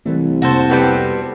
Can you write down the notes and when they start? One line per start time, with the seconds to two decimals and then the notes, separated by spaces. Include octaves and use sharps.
0.06 C2 E3 A3
0.42 F2 C3 A#3 F#4 A4 C5
0.69 G3 B3 C4